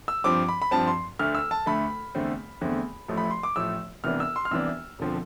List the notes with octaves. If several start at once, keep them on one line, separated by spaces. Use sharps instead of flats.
E6
G2 F3 C4 D6
B5
B5
G2 F3 C4 A5
C6
D2 D3 A3 F6
E6
A5
D2 D3 A3 B5
E2 D3 A3 C4
E2 D3 A3 C4
A1 A2 F3 A3
B5
C6
D6
A1 A2 F3 A3 E6
C2 C3 E3 B3 D4 F6
E6
C6
F6
C2 C3 E3 B3 D4 E6
E1 D3 F3 C4